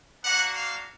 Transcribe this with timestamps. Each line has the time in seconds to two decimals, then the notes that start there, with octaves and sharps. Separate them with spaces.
0.23 A#3 D4 F#4 F#5
0.55 F5